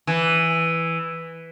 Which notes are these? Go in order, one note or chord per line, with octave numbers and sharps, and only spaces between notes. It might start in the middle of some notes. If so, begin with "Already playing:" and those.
E3